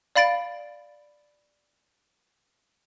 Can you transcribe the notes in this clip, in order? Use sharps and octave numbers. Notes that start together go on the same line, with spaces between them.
D5 F5 B5 A6 D7